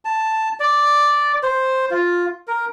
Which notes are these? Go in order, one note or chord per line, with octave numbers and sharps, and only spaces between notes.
A5
D5
C5
F4
A#4